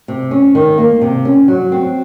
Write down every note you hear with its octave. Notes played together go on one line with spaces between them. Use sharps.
C3
C#4
D#3
A#3
C3
C#4
F#3
C4